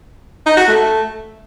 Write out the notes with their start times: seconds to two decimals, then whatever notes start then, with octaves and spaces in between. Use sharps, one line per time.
0.46 D#4
0.57 F#4
0.68 A3